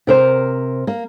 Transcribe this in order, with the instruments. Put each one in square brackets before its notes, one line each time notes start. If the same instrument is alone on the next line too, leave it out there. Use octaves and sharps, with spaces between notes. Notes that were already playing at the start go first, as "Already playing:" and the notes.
[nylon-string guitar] C3 A#4 C5
A#3